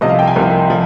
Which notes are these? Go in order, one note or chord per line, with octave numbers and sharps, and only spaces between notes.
C2 C3 F3 D#5
F5
G5
G#5
C2 C3 F3 A#4
F3